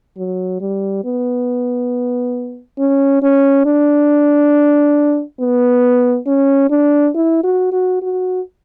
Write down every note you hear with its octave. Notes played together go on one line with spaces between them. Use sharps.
F#3
G3
B3
C#4
C#4
D4
B3
C#4
D4
E4
F#4
F#4
F#4